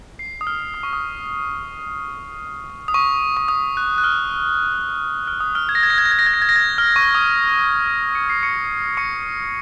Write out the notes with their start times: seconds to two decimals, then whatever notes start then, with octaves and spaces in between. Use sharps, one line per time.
0.19 C7
0.41 D#6
0.47 F6
0.74 D#6
0.83 C#6
0.93 D#6
2.88 D#6
2.94 C#6
3.37 C#6
3.48 D#6
3.77 F#6
3.98 F#6
4.04 F6
5.28 F6
5.40 D#6
5.55 F6
5.69 G#6
5.75 A#6
5.83 G#6
5.90 A#6
5.98 G#6
6.05 A#6
6.11 G#6
6.19 A#6
6.27 G#6
6.34 A#6
6.42 G#6
6.49 A#6
6.56 G#6
6.78 F6
6.96 C#6
7.15 D#6
7.87 F6
8.15 C#7
8.30 C7
8.43 C#6 C#7
8.97 C#6 C#7